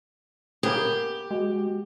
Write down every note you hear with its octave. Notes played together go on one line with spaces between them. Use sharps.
A#3 B3 G4 G#4
G#3 F#4